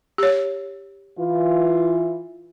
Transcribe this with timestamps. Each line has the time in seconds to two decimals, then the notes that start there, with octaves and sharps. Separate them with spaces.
0.18 G4 C#5
1.19 E3 F4